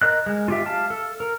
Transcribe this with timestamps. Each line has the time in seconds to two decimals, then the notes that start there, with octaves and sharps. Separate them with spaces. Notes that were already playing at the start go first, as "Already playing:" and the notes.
0.02 A#4 D#5 F#6
0.26 G#3
0.48 F4 G4 E5
0.66 F5 A5
0.90 A4
1.20 A#4